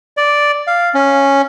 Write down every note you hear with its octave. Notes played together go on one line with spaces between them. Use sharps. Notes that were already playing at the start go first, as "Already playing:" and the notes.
D5
F5
C#4